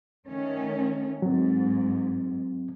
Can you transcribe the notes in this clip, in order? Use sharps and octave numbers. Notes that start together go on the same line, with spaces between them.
D#3 A3 C#4
G#2 F#3 C4